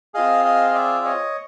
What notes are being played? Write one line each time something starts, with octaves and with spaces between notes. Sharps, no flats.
C4 F4 G#4 D#5 F5
D#5 F5
D#5
D5 E5
C#5 D#5